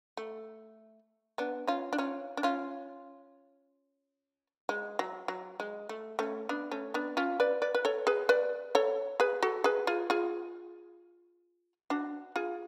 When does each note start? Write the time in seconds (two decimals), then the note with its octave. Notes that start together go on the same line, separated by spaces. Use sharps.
0.17 A3
1.38 B3 D4
1.68 C#4 F4
1.93 D4
1.98 C#4 F4
2.37 D4
2.43 C#4 F4
4.69 G#3
4.99 F#3
5.28 F#3
5.60 G#3
5.89 A3
6.19 A3 C#4
6.49 B3 D4
6.71 A3 C#4
6.94 B3 D4
7.17 C#4 F4
7.40 B4 D5
7.62 B4 D5
7.75 B4
7.85 A4 C#5
8.07 G#4 B4
8.29 B4 D5
8.75 A4 C#5
9.20 G#4 B4
9.43 F#4 A4
9.64 G#4 B4
9.87 F4 G#4
10.10 F4 G#4
11.90 D4 F#4
12.36 F4 G#4